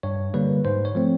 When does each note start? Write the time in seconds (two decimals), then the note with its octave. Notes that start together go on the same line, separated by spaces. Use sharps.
0.03 G2 C#5
0.34 D3 G3 A#3 B4
0.65 G#2 C5
0.85 C#5
0.95 F3 A3 C4